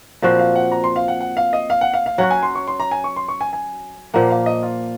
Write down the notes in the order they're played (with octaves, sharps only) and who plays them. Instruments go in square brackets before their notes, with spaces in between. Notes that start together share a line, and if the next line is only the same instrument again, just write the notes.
[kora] A#2 F3 C4 F#4 [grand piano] F5
[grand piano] F5
F#5
A#5
C6
F5
F#5
F#5
F5
D#5
F5
F#5
F5
F5
[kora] F#3 C#4 F#4 [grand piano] F#5
[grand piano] G#5
C6
C#6
C6
A#5
G#5
C#6
C6
C#6
G#5
G#5
[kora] A#2 F3 A#3 [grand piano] F#5
[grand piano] F5
D#5
F4